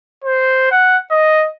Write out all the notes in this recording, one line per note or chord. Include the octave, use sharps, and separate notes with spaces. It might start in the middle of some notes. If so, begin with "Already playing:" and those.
C5
F#5
D#5